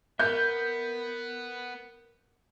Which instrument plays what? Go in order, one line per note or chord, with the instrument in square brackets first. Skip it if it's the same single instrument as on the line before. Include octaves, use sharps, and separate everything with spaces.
[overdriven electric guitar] B3 [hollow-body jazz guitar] A#4 E5 [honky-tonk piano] G6